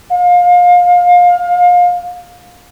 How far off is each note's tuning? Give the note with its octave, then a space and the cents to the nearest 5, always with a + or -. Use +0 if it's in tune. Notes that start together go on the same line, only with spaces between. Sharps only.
F5 +30